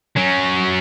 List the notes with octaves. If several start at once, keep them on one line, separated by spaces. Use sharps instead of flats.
F#3 C#4